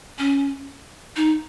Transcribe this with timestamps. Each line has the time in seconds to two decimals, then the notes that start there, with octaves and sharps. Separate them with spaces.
0.19 C#4
1.16 D#4